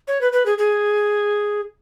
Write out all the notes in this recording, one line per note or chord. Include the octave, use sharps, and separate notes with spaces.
C#5
B4
B4
G#4
G#4